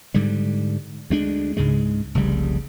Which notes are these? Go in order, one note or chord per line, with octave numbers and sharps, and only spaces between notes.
G#2 D3 G3
D2 G#3 D4
C#2 G#2 C#3 G#3
F1 C2 C#3 G3